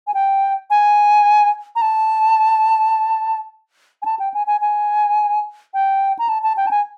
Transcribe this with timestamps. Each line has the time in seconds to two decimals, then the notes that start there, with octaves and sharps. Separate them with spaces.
0.07 G#5
0.14 G5
0.70 G#5
1.76 A#5
1.82 A5
4.02 G#5
4.05 A5
4.19 G5
4.34 G#5
4.47 G#5
4.61 G#5
5.74 G5
6.19 A#5
6.29 A5
6.43 A5
6.57 G5
6.67 A5
6.71 G#5